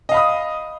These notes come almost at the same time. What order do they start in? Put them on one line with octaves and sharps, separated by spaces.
D#5 F5 B5 D#6